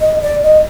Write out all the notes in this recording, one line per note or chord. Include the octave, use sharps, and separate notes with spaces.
D#5
D5
D#5